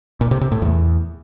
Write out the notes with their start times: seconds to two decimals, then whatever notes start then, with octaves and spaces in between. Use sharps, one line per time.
0.21 A#2
0.31 C3
0.41 C3
0.52 A2
0.62 E2